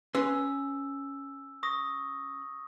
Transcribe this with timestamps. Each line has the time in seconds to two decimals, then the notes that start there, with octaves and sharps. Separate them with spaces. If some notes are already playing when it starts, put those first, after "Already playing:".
0.15 C#4 B4 C6 E6
1.63 C#6 D#6 A#6